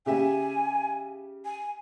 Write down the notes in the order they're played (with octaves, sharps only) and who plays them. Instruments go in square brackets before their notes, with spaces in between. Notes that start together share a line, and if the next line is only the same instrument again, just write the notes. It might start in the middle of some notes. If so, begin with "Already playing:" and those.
[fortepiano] C#3 G4 E5 [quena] G#5
[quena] G#5